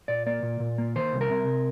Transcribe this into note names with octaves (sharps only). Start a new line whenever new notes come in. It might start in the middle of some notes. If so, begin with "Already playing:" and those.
A#2 D5
A#3 D5
A#2
A#2
A#3
D#3 C5
C2
A#4
C3